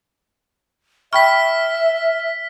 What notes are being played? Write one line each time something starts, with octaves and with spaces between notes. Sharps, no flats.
E5 G5 B5 C#6 F6 B6